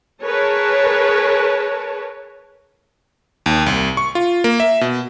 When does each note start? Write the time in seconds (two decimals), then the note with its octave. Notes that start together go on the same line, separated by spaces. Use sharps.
0.23 G#4 A#4 B4 C#5 A5
3.46 D#2
3.66 C2
3.97 C#6
4.15 F4
4.44 A#3
4.60 E5
4.81 B2